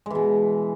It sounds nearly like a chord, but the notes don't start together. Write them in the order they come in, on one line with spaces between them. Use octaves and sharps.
G#3 E3 B2